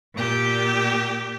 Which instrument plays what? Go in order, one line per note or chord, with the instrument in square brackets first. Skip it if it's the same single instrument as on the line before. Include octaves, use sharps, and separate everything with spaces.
[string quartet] A#2 G4